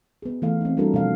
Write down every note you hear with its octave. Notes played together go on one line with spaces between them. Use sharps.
B3 G#4
E3 A3 F5
C4 D#4
G3 D4 E4 F#4 A4 A#4
B2 F3 F5